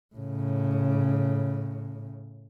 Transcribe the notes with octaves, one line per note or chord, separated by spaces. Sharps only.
A2 C#3